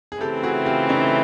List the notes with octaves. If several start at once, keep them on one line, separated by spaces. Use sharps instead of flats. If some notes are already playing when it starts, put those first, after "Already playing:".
G#4
C#3 E3 A3 C4 G4 A4
F#4 G#4
F4 G4
C#4 D#4